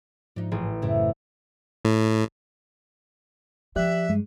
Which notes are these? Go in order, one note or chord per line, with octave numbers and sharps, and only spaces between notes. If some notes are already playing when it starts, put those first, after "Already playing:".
G#2 F3 D4 D#4
A1 G#4
F#2 A2 C#3 A3 C4 E4
A2
F3 G4 D5 E5 F#6
G2 G#3